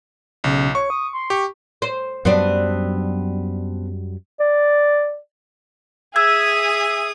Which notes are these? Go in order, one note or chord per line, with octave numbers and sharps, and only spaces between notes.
B1 C#3
C#5 C#6
D#6
C6
G4 C#6
C5
F#2 F#3 G3 B3 C4 D4
D5
G#4 E5 D#6 E6 G#6